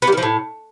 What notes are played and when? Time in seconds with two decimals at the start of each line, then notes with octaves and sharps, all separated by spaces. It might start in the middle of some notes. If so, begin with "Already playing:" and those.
0.02 B3
0.07 G3
0.12 D#3
0.17 F3
0.23 A2